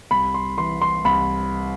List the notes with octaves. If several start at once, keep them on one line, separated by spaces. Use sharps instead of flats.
C2 B5
C6
E3 C6
C6
C2 B5